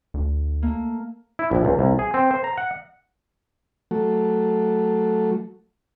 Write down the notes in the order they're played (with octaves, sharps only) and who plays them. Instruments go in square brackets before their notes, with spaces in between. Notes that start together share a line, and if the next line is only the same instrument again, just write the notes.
[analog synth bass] D2
[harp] A3 A#3
[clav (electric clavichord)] E4
A#1
C#2
C2
G#4
C4
C5
A#5
F#5
[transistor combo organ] F#3 A3